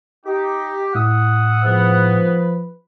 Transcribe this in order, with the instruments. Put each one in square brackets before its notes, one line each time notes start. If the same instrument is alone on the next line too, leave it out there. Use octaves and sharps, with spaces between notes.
[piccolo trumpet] D#4 [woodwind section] G4
[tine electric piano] A2 [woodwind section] E4 D#6 E6 [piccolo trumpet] F#5
[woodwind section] G#2 B3 [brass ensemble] F3 B4